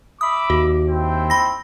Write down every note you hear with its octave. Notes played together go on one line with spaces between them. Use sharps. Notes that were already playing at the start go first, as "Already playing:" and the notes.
E5 B5 D6 D#6
D#2 F#4
C4 E4 G5
B5 A#6